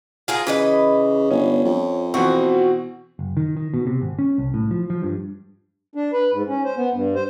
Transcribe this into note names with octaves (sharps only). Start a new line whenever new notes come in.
F4 G#4 A#4
C#3 E3 B4 D#5
G1 C#4
F2
B2 E3 C4 F#4
F#1
D#3
D#3
B2
C3
G#1
C#4
C2
A2
F3
F3
G2
D4
B4
G#2
C#4
C5
B3
G2
C5